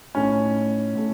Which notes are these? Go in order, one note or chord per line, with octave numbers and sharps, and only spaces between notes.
A2 A3 C#4 D#4
A2 A3